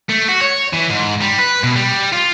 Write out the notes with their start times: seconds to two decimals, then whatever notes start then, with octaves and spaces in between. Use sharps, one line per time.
0.10 A3
0.29 F#4
0.42 C#5
0.73 E3
0.90 G#2
1.21 G3
1.39 B4
1.63 B2
1.76 G3
2.12 F4